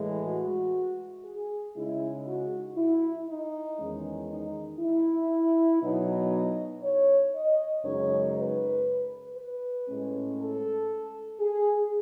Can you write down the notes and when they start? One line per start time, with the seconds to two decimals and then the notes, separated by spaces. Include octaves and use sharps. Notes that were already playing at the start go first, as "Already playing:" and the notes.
Already playing: A2 E3 G#3
0.23 F#4
1.24 G#4
1.75 C#3 G#3 D#4 E4
2.25 F#4
2.76 E4
3.28 D#4
3.79 E2 D#3 G#3 C#4
4.29 D#4
4.79 E4
5.81 B2 F#3 B3 D#4
6.32 D#5
6.83 C#5
7.34 D#5
7.84 F#2 C#3 G#3 D#4 C#5
8.35 B4
9.36 B4
9.87 A2 G#3 C#4
10.38 A4
11.40 G#4